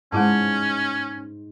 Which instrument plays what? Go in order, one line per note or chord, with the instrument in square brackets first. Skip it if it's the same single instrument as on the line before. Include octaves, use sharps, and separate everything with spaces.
[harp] G#2 [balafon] G#3 E4 A5 [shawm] C#4